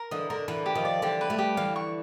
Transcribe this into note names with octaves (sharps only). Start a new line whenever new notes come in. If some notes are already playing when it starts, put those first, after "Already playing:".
Already playing: A#4
D3 E3 D#5
D3 A#4
D3 E3 B4
G4
D#3 F3
D5
D3 E3 G4
B4
G3 A3
G4
D3 E3 F5
C#6